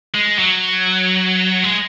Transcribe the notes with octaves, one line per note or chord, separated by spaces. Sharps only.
G#3
F#3
G#3